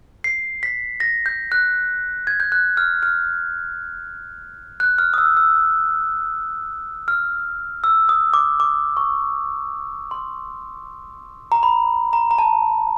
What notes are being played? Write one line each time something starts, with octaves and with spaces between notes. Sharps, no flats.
C7
B6
A#6
G6
F#6
G#6
G6
F#6
F6
F6
F#6
F6
D#6
E6
E6
F6
E6
D#6
D6
D6
C#6
C6
A#5
B5
A#5
A#5
A5